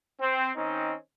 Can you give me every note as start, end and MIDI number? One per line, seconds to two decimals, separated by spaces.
0.20 0.50 60
0.56 0.95 51
0.56 0.95 60
0.56 0.95 61
0.56 0.95 63